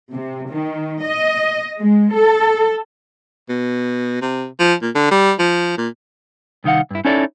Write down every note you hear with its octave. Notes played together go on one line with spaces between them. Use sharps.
C3
D#3
D#5
G#3
A4
B2
C3
F3
A#2
D3
G3
F3
A#2
C2 D#3 D#4 F5 F#5
G2 E4
C#4 D#4 E4 A4 C#5 D5